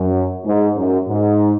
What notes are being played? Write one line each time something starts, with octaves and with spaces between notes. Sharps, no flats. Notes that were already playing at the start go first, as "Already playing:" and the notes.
Already playing: F#2
G#2
F#2
G#2